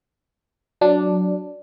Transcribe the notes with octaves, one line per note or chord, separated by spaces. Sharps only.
F#3 D4